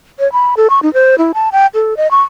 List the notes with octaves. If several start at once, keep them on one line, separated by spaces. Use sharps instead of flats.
C#5
B5
A4
C#6
D#4
C5
E4
A5
G5
A4
D#5
C#6